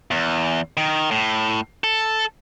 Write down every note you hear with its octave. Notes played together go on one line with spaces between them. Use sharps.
E2
D#3
A2
A4